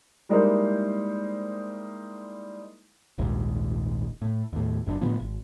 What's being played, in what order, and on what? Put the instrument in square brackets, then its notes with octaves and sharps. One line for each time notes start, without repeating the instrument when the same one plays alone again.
[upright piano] G3 G#3 A#3 D#4 E4 C5
[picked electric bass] D#1 A#1 D#2 G#2
A2
D#2 A2
F#1 F#2 C4 D4
A2 D3 F3 B3
G#1